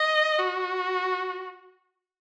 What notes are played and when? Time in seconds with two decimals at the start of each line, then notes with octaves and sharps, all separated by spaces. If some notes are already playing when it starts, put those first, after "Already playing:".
Already playing: D#5
0.38 F#4